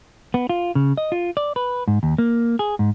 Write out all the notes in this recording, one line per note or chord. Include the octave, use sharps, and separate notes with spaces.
B3
F4
C#3
D#5
F4
D5
B4
G#2
D#2
A#3
G#4
G#2